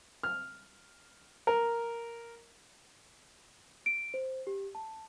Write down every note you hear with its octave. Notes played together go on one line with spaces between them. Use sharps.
F6
A#4
D7
C5
G4
A5